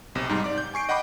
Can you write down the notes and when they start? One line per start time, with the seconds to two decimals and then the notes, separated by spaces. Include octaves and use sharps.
0.15 B1 C3
0.29 G#2 G3 D#4
0.44 D5 D6
0.58 G6
0.74 G#5 C#6 C7 D7
0.89 D#5 F#5 G5 B5 D6